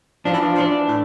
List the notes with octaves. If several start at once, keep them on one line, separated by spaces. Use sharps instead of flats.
F3 D4
E3
F3
F3
E3 D4
A2